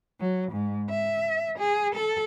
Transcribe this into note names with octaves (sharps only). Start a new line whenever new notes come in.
F#3
G#2
E5
G#4
A4